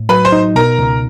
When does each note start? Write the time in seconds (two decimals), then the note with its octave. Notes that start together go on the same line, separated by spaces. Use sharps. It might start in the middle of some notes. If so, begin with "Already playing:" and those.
Already playing: A2
0.09 F#3 B4 B5
0.25 C5 C6
0.32 D#4
0.55 B2 A#4 A#5
0.79 C#2